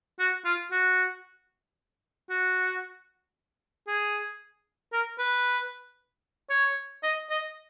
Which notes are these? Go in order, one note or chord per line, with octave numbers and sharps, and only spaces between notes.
F#4
F4
F#4
F#4
G#4
A#4
B4
C#5
D#5
D#5